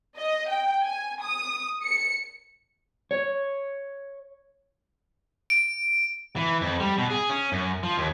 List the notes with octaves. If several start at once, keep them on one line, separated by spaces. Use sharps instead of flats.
D#5
G5
G#5
D#6
C#7
C#5
D7
E3
F2
G3
B2
G#4
C#4
F#2
F3
D#2